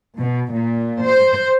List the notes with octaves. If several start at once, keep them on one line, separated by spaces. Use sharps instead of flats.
B2
A#2
C5